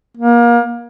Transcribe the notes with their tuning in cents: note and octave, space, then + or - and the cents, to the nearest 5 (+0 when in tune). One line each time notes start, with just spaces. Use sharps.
A#3 +30